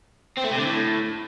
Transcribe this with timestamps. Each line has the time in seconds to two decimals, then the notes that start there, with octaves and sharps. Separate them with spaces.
0.37 C4
0.44 A3
0.51 C3
0.58 D3
0.65 A2